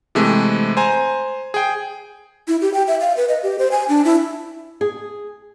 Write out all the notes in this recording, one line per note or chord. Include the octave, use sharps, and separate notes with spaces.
C3 E3 G#3 A3 C4
C5 G#5 A#5
G#4 G5
E4
G4
G5
E5
F5
B4
D#5
G4
C5
G#5
D4
E4
G#4